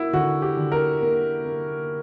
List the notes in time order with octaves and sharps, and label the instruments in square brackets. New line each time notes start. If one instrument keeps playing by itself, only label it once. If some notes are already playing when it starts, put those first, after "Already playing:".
Already playing: [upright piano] A#3 [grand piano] E4 F#4
[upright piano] D3 [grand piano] F#4
[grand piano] G4
[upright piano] D3
[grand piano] A#4
[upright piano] A#3
A#3